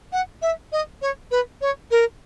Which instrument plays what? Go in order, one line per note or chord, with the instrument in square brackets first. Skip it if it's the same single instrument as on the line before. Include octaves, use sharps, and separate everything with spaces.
[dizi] F#5
E5
D#5
C#5
B4
C#5
A#4